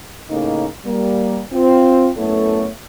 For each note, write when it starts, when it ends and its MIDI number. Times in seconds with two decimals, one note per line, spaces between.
0.29 0.66 45
0.29 0.66 49
0.29 0.66 58
0.29 0.66 63
0.86 1.40 55
0.86 1.40 58
1.53 2.09 60
1.53 2.09 65
2.17 2.68 42
2.17 2.68 57
2.17 2.68 59
2.17 2.68 64
2.17 2.68 69
2.17 2.68 73